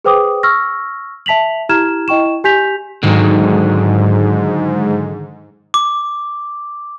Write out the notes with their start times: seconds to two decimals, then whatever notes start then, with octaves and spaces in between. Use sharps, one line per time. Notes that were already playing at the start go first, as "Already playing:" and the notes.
0.05 G#4 B4 C5 G5 D6 D#6
0.43 C#6 E6 F6 A#6
1.26 E5 A5 B6 F7 F#7
1.69 E4 G4 A#5 F6 G#6 E7
2.08 E4 D#5 G5 C#6 E7
2.44 G4 G#5 G6 B6 F7
3.03 G#2 D3 D#3 F#3
5.74 D6